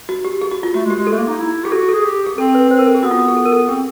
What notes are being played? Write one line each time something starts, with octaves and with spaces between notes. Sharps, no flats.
F#4
G4
G#4
F#4
F4
A3 F#4
G#3
G4
G#3
A4
A3
A#3
D#4
E4
G4 G#4
F#4 A4
A4
G#4
G4
G#4
C4 A4
B4
C4 C5
A#4
A4
G#4
B3 F#4
F4
F#4
G#4
A4
A#4
A4
C4 G#4